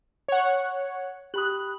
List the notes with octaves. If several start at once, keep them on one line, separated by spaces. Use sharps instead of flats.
C#5 F#5
G4 B5 D#6 F#6